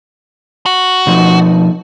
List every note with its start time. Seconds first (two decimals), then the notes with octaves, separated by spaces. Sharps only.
0.66 F#4
1.07 B2 F3 D#4